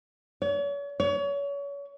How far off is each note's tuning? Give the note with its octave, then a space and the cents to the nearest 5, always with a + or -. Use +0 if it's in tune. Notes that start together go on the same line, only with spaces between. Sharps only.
C#5 +40
C#5 +30